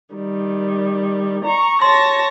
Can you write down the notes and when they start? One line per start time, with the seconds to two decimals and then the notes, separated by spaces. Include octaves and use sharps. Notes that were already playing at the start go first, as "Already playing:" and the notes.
0.14 D#3 G3
1.43 A#5 C#6
1.82 C#5 A5 C6 A#6